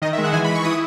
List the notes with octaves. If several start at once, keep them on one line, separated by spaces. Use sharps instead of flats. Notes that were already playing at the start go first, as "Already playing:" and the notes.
D#3 D#5
E5
G#3
F#5
E3 G#5
B5
E3
C#6
E4 D#6